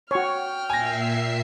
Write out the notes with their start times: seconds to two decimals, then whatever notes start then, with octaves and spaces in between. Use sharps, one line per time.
0.11 F#4 C#5 G5 F6
0.70 A#2 E5 G#5 A#6 C7